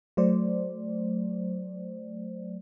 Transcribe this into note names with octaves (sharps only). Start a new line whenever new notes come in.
F#3 A3 C5 D5